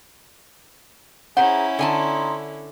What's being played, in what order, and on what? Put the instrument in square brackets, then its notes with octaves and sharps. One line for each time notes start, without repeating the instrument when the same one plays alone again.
[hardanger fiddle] C#4 E4 [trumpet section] G#4 A#5 [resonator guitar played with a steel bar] C5 [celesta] F#5
[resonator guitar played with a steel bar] D3 G#5 A5 [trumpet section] D#4 C6